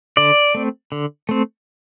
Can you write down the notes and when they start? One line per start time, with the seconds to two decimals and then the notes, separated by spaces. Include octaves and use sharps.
0.17 D3 D5
0.55 A3 C4
0.92 D3
1.29 A3 C4